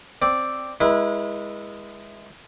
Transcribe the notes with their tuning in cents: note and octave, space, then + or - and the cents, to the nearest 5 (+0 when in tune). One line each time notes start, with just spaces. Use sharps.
C4 +5 D5 +0
G#3 -15 E4 +0 B4 -40